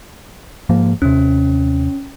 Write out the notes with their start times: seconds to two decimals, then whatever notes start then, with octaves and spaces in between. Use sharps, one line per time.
0.69 G#2 F3 A#3
1.02 D#2 C3 C#4